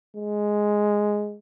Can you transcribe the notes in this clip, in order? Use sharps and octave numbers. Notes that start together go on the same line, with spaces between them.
G#3